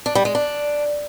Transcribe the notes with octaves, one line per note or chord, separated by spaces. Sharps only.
D4
G3
G#3
D4